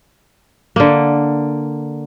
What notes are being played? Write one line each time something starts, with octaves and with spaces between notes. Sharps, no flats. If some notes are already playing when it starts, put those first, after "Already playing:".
D3 A#3